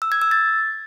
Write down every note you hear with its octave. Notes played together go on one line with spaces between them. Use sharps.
E6
G#6
E6
A6